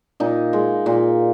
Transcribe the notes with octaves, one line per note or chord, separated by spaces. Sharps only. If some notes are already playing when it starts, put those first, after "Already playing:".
A#2 D#4
G#3
A#2